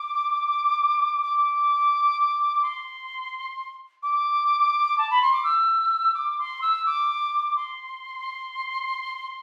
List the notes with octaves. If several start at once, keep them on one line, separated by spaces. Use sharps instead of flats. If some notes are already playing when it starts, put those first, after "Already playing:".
Already playing: D6
D6
C6
D6
A5
B5
C6
D6
E6
D6
C6
E6
D6
C6